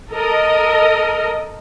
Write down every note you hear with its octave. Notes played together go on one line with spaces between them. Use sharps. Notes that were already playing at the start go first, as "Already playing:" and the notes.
A4 A#4 D#5